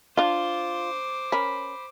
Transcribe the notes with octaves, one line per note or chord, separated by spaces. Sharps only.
D4 F4 C5 F5 D6
C#4 A#4 B5